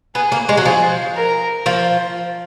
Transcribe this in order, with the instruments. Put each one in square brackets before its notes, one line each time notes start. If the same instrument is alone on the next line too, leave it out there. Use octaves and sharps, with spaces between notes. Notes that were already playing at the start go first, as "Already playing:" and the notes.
[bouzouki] B3 [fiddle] G#4
[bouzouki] A#3
G#3
F#3
[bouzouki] F3 [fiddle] G#4
[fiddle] A#4
[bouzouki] F3